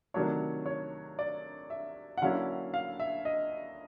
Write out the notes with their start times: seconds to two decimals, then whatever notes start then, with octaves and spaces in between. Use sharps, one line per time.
0.14 C3 D#3 F#3 A3 D4 C#5
0.66 C#5
1.19 D5
1.70 E5
2.18 F#5
2.22 D3 F#3 A#3 C#4 E4 F5
2.74 F5
3.00 E5
3.25 D#5